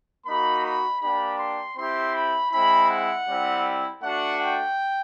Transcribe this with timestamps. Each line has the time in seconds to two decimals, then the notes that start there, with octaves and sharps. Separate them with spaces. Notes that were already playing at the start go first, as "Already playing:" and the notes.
0.26 A#3 D#4 F#4 B5
0.64 B5
1.01 A#3 D4 G4 B5
1.39 C6
1.77 C4 E4 G4 C6
2.15 B5
2.52 G#3 C4 E4 B5
2.90 F#5
3.28 G3 C4 E4
4.03 A3 D4 F#4 F#5
4.41 G5